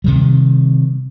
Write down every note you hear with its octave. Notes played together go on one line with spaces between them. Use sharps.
C3 D#3 G3